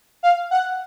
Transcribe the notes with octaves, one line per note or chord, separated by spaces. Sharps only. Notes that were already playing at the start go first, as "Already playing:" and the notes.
F5
F#5